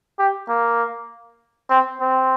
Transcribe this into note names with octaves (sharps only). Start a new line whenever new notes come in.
G4
A#3
C4
C4